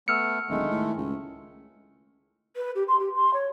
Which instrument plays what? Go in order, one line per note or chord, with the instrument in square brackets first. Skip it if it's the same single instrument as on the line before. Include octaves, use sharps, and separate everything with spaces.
[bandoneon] A3 B3 [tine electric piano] E6 F6 C#7
[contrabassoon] D1 [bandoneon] D#3 G#3 A3
[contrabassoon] A2
C#2
[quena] B4
G4
C6
G4
C6
C#5